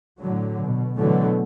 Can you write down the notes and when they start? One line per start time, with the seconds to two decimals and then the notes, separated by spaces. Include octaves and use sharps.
0.20 A2 D3 F#3
0.63 B2
0.98 B2 D3 E3 F#3 A3